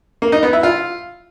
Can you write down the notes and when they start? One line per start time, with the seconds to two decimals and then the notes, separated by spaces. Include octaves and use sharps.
0.22 A#3
0.32 D#4
0.43 B3
0.53 E4
0.63 F4